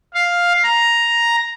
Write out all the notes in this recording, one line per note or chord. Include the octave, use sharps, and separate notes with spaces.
F5
A#5